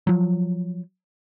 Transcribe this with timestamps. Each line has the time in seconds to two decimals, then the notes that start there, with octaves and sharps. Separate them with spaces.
0.07 F3 F#3